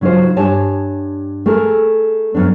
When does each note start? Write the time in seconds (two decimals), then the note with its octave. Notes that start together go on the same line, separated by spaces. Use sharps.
0.01 C#3 F#3 D#4 F4 C5
0.37 G2 G4 C#5 G#5 A5
1.46 A3 G#4 A#4
2.34 F#2 B3 D4